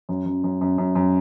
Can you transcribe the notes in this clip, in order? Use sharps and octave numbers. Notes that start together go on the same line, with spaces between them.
F#2
F#2
F#2
F#2
F#2
F#2